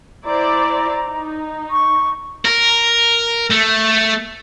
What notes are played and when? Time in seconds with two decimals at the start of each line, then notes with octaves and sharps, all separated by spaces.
0.25 E4 C5 D5 A#5
1.07 D#4
1.71 C#6
2.45 A#4
3.50 A3